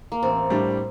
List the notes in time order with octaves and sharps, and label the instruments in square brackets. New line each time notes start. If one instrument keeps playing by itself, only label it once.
[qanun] A#3
[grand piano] A1 [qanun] C4
[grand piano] A2 G3 D4